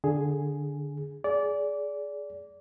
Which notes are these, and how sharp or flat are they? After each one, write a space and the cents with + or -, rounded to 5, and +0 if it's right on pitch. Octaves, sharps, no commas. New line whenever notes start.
D3 +0 G#4 +0
G#4 +10 D5 -20